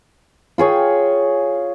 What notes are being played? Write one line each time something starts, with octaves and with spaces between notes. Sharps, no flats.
F4 G#4 C#5 G5